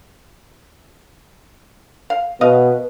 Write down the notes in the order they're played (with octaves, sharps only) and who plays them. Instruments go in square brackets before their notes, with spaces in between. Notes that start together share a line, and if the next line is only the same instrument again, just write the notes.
[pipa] F5
[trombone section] B2 [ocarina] B4 [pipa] D#5 F5